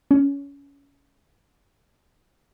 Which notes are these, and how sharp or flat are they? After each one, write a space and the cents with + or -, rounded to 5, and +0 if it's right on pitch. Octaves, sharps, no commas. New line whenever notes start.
C#4 +20